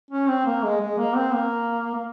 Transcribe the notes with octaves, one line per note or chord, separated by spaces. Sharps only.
C#4
C4
A#3
G#3
G#3
A#3
C4
A#3
A#3